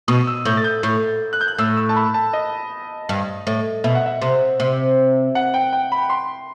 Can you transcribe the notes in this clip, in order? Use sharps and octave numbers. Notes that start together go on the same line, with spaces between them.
B2 D#6
E6
A2 G6
A6
G6
A2 G6
F#6
G6
F#6
A2 E6
E6
A5
B5
A5
D#5
G2
A2
B2 E5
F#5
E5
C3
C3
F#5
G5
G5
B5
C6